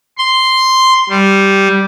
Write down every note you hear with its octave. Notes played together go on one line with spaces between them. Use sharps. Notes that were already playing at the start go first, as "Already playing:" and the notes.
C6
G3